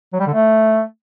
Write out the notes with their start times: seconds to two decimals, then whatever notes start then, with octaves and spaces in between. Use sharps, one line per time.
0.13 F#3
0.20 G3
0.27 D3
0.33 A3